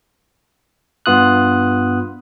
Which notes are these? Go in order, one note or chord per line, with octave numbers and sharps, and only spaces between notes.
G2 B3 F4 D#6 F#6